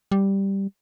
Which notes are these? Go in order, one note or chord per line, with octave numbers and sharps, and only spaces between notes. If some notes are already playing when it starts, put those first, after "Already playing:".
G3